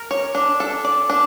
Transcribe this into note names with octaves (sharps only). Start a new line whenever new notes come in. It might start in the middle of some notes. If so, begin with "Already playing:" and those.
Already playing: A#4
C#5
D4
A4
D5
D4